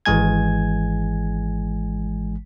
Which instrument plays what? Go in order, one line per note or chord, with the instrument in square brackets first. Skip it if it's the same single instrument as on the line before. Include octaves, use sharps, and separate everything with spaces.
[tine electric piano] G#1 E3 G#3 G#5 G#6